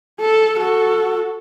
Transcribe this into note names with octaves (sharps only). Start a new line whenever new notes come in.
A4
F#4 A4